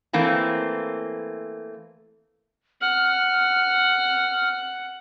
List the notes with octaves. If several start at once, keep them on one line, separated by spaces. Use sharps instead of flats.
E3 A3 A#3 C4
F#5 F6